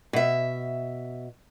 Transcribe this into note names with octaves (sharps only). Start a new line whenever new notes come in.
B2 E5